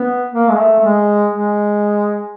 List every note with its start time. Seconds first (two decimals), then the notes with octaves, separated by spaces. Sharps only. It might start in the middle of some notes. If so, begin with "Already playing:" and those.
Already playing: B3
0.32 A#3
0.50 G#3
0.57 A3
0.79 A3
0.82 G#3
1.33 G#3